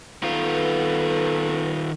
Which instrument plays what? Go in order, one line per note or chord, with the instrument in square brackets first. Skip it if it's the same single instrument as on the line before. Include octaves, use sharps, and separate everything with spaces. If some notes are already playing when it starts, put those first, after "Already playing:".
[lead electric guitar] D#3 F4 [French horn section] B3 A4 B4